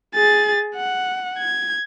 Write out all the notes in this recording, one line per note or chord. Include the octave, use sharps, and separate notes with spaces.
G#4 A6
F#5
G#6